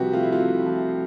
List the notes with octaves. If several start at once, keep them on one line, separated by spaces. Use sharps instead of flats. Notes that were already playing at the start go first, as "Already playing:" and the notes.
Already playing: C2 C3 F3 F#4 G4 B4
A3 F4
E4
F4
C3
F3